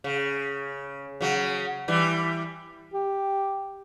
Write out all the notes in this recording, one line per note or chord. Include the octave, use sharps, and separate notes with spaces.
C#3
C#3 F#3
E3 G3
G4